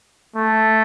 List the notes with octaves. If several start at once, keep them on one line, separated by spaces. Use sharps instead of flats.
A3